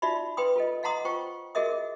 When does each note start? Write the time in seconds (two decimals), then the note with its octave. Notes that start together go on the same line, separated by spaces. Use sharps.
0.02 D#4 F4 F#4 D5 E5 B5
0.37 B4 G5 C6 D#6
0.56 F4 A4 D#5
0.83 D#5 F5 F#5 A#5 C6 D#6
1.05 F4 C5 G5 C#6
1.55 F#4 G#4 A#4 D#5 E5 D#6